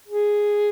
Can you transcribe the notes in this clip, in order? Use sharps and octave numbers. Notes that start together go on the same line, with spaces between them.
G#4